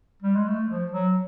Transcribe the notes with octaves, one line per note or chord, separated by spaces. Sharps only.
G3
G#3
A3
F3
F#3